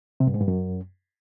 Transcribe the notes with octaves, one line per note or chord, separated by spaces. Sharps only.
C3
G2
G#2
G2
F#2